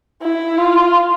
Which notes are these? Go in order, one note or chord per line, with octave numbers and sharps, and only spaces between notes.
E4
F4